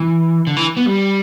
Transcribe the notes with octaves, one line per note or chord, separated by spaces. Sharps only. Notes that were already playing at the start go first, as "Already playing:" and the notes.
Already playing: E3
D3
E3
B3
G3